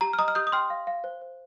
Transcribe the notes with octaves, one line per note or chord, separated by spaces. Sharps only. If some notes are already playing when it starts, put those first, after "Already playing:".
G4 A#5
F6
D#5 A#5 D#6
F6
G4 D#6 G6
D#6
G5 C6 F6
F5
F5
C5
C5